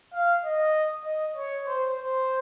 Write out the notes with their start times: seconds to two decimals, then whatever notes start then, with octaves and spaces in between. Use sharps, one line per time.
0.13 F5
0.44 D#5
1.04 D#5
1.36 C#5
1.66 C5
1.96 C5